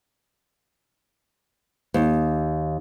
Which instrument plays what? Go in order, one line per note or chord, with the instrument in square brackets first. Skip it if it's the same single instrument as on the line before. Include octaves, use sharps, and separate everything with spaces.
[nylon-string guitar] D#2